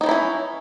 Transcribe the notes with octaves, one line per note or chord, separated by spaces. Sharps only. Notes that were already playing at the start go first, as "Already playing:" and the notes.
E3 F3 C#4 D#4 E4